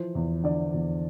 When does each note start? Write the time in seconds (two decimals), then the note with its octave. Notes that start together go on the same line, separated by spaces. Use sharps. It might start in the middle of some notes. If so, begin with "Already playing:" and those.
Already playing: E3 F3 C5
0.15 E2
0.44 D3 D5
0.74 E2